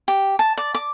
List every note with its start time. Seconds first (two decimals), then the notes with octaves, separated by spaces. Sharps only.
0.08 G4
0.39 A5
0.57 D5
0.75 D6